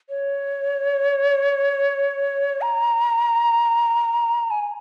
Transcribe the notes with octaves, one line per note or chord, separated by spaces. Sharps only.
C#5
A#5
G#5